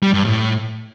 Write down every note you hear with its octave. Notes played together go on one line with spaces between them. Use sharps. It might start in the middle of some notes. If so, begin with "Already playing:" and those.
G3
G2
A2